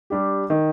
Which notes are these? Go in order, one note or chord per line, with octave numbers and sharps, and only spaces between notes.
G3 D4 G4
D#3